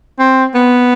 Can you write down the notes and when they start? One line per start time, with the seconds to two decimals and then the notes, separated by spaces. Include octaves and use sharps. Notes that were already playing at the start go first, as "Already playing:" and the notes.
0.19 C4
0.55 B3